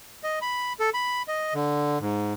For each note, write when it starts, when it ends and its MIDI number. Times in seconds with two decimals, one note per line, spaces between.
0.24 0.39 75
0.42 0.73 83
0.80 0.90 69
0.94 1.22 83
1.28 1.54 75
1.54 1.98 50
2.00 2.34 44